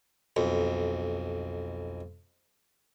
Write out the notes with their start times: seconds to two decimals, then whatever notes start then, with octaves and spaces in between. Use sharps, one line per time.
0.36 B1 F2